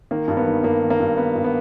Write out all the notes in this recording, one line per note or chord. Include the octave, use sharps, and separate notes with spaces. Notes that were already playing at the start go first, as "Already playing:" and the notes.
D#3 A#3
G2
B3
D#3
G2 A#3
D#3
A#3
G2
D#3 B3
G2
B3